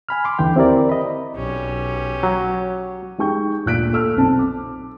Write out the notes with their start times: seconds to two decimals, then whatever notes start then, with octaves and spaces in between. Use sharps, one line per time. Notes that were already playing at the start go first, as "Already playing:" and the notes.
0.09 G#5 B5 F6
0.25 C6 D6
0.39 D#2 D3 E3 G5
0.56 C4 E4 G4 A#4 D5
0.89 D#5 B5
1.36 B1 C#4 G4
2.23 F#3
3.18 G#3 D#4 G4 G5 C#6 G6
3.66 D2 A#2 F4 F#6 B6 D7
3.93 A4 E6 F6
4.16 B1 C4 A5
4.39 D6